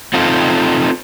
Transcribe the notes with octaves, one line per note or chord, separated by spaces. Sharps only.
C4 D#4 F4 A4